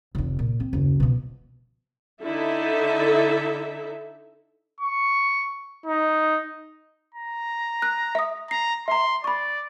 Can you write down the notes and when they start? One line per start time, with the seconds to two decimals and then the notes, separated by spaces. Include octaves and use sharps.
0.15 F1 D#3
0.39 A#2
0.60 C4
0.73 F#1 D#2
1.00 B2 F3
2.23 D3 D#4 E4 A4 E5
4.81 C#6
5.86 D#4
7.14 A#5
7.82 F#6
8.15 E5 D#6
8.51 A#5 C7
8.88 E5 A#5 C6
9.24 D5 B5 C#6